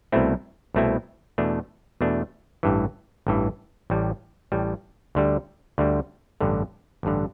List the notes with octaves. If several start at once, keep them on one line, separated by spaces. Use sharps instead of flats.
C2 B2 A3 C4 E4
C2 B2 A3 C4 E4
E2 B2 A3 D4
E2 B2 A3 D4
A1 G2 E3
A1 G2 E3
A1 A2 G3
A1 A2 G3
D2 D3 G3
D2 D3 G3
A1 G2 D3
A1 G2 D3